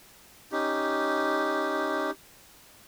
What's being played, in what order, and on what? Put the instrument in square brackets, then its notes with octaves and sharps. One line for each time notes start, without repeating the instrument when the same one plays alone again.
[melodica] C#4 D#4 G4